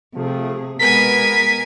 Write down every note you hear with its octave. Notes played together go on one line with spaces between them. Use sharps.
C3 F3 A3 G#4
B2 G#3 B3 A#4 G#5 B6